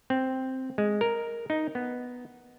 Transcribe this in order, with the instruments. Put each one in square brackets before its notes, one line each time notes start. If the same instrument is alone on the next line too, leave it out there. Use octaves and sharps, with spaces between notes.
[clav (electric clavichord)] C4
G#3
A#4
D#4
B3